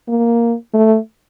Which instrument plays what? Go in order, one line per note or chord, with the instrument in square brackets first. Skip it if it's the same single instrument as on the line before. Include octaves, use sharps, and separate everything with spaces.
[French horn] A#3
A3